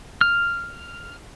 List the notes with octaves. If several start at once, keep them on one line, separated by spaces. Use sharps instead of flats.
F6